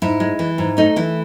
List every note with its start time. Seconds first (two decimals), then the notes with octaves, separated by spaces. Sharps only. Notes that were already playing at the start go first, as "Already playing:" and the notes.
0.02 G#2 E4
0.20 G#3
0.39 E3
0.58 G#2
0.77 A3 D#4
0.96 E3 E4